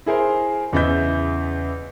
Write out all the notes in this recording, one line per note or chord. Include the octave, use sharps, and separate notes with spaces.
E4 G#4 A#4 C5
E2 C#3 E4 D#5 E5 G6